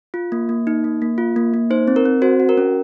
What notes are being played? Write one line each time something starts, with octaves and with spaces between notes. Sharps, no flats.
F4
A#3
A#3
D#4
A#3
A#3
F4
A#3
A#3
D#4 C5
C4
A#4
C4
F#4 C5
F#4
A#4
C#4